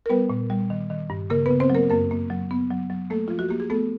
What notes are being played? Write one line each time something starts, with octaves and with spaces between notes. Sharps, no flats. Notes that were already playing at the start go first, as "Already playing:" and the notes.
A#4
G3 B3 B4
A#2
G3
D#3
D#3
G2
C#3 A#3 A#4
B3 B4
C#3
C4 C5
F#3
A#3 A#4
F#2 A#3 A#4
A#3
F#3
B3
F#3
F#3
A3 A#3 A4
F3 F4
F#4
A#3 G4
G#4
A3 B3 A4